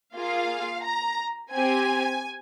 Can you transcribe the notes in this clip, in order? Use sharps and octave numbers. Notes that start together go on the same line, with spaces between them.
A#3 F4 G#4 F5
A#5
C4 G4 G#5